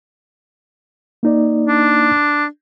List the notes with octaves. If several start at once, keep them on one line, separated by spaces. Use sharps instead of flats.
A#3 D#4 D5
D4